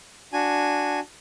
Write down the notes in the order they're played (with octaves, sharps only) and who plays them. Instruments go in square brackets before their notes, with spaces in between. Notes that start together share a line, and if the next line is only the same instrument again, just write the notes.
[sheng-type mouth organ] D4 F#4 G#5